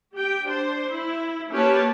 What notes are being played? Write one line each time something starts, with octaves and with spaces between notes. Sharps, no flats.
G4 G5
D4 C5
E4
A#3 C#4 G4 B4 C#5 A5